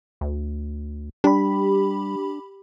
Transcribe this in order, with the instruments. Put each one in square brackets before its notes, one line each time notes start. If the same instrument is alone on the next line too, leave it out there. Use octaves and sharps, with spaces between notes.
[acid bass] D2
[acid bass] G3 [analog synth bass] D4 [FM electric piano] G4 B5